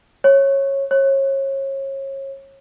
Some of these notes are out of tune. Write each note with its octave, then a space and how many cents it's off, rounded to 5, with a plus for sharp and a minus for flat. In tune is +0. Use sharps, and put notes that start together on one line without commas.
C#5 -15
C#5 -30